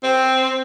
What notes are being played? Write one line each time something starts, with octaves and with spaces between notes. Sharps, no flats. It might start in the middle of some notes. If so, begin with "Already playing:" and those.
C4